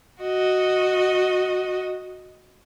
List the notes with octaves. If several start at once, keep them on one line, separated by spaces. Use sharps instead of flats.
F#4 D#5